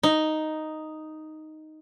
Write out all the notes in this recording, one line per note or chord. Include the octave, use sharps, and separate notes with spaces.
D#4